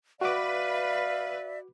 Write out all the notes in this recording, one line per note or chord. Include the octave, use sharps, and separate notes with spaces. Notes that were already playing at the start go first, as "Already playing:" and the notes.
F#4 B4 D5 E5 F5 D6